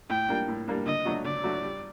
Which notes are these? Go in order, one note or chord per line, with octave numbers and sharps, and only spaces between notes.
A2 G5
G3 A#3 D4
A2
G3 A#3 D4
D3 D#5
F#3 A3 D4 F#4
D3 D5
F#3 A3 D4 F#4
G3